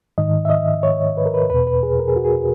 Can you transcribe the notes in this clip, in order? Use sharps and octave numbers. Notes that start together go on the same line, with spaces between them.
G#2 D#3 D#5
E5
D#5
C#5
B4
A#4
B4
E2 B2 B4
B4
G#4
A#4
G#4
F#4
G#4